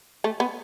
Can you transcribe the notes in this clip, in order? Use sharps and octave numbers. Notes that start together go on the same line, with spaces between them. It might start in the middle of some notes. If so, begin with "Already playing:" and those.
A3
B3